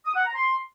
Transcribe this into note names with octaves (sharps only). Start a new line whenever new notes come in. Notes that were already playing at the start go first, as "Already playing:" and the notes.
D#6
F#5
A#5
C6